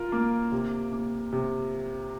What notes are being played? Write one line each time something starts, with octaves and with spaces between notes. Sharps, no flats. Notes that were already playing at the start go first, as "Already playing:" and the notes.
Already playing: F4 A#4
A#3
C3
A#3
C3